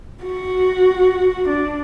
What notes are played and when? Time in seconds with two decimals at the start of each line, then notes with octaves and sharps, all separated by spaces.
0.24 F#4
1.48 D4